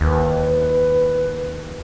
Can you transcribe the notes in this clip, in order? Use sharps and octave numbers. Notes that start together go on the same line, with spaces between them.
D#2 B4